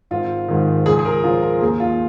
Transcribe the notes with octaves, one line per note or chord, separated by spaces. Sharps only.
G#1 F4
G#2 D#3
C#2 G#4
G#4
A#4
C#3 F3 F4
A#4
D#2 G#4
F4